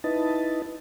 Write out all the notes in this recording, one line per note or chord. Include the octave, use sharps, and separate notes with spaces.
D#4 E4 B4 D#5 A5